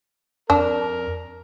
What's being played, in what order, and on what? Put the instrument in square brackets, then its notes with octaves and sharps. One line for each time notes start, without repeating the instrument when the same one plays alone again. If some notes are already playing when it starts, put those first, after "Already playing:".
[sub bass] F2 [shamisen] D4 [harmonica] A#4